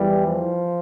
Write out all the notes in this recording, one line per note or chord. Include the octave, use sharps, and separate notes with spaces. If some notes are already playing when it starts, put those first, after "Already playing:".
Already playing: E2 E3 G3
F3